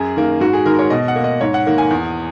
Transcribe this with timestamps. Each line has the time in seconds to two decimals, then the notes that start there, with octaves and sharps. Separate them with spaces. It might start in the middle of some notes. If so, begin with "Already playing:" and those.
Already playing: F#2 G#4
0.16 D#3 A#3
0.40 G#2 F#4
0.53 G#4
0.66 D#3 G#3 A#4
0.79 C#5
0.90 B2 D#5
1.08 F#5
1.16 A#3
1.24 D#5
1.41 G#2 C#5
1.54 F#5
1.67 D#3 A#3
1.78 G#5
1.90 E2